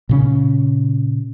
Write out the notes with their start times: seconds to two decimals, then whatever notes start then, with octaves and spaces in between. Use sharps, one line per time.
0.09 A#2 C#3 C#4